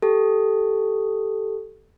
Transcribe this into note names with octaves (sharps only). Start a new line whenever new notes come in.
G4 A4